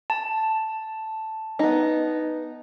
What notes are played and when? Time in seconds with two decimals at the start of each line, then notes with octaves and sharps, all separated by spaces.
0.10 A5
1.59 B3 D#4